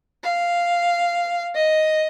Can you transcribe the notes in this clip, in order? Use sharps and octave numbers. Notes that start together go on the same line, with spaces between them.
F5
D#5